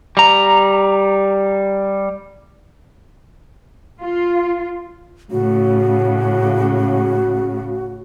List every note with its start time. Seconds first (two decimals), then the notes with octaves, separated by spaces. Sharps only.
0.17 G3 A#5
4.01 F4
5.31 A2 C#3 F#4